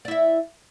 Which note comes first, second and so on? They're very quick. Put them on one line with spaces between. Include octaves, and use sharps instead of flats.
D5 E4 E5